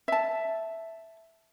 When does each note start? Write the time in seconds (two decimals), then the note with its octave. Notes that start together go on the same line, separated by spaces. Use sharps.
0.08 E5 A5